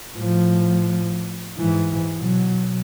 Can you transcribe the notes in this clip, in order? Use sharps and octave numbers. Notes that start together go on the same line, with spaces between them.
A2 F3
G#2 E3
B2 F#3